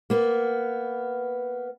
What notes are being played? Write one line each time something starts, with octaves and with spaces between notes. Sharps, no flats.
A#3 B3